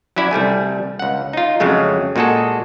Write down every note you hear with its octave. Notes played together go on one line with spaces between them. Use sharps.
F#3 C#4 E4 D5
C2 G3 A3 G#5
C#2 F#5
D#4 F4
F2 C#3 F#3 G#3 A3
A#2 G#3 F#4 G#4 A4